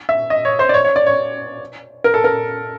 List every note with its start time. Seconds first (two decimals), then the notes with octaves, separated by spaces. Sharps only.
0.09 E5
0.30 D#5
0.45 C#5
0.59 C5
0.69 D5
0.74 C#5
0.84 C#5
0.96 D5
1.06 C#5
2.04 A#4
2.14 A4
2.24 A#4